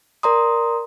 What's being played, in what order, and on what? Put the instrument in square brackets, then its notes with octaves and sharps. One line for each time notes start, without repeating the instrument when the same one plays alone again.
[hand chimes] A#4 D5 A#5 C6 D#6